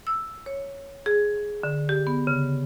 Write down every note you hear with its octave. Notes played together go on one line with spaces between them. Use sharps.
E6
C#5
G#4
D3
G4
B3
C#3